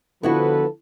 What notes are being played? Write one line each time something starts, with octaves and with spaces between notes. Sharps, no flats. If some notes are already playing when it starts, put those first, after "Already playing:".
D3 F3 B3 E4 F#4 A4 B4